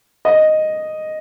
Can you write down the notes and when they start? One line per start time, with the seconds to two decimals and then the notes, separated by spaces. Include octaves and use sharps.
0.25 D#5